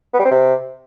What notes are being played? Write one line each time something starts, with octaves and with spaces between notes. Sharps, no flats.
B3
G3
C4
C3